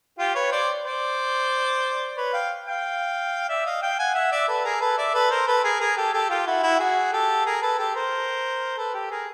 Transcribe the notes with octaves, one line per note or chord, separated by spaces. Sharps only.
F4 G4
B4 C#5
C5 D5
C5 D5
B4 C#5
F5 G5
F5 G5
D5 E5
D#5 F5
F5 G5
F#5 G#5
E5 F#5
D5 E5
A4 B4
G#4 A#4
A4 B4
D5 E5
A4 B4
A#4 C5
A4 B4
G#4 A#4
G#4 A#4
G4 A4
G4 A4
F4 G4
E4 F#4
E4 F#4
F#4 G#4
G4 A4
G#4 A#4
A4 B4
G4 A4
A#4 C5
A4 B4
G4 A4
G#4 A#4